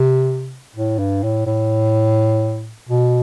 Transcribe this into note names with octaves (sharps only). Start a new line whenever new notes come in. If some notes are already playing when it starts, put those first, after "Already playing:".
Already playing: C3
A2
G2
A2
A2
B2